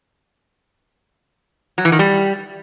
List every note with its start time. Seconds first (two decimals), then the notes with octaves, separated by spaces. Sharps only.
1.78 F#3
1.85 E3
1.92 D#3
1.99 G3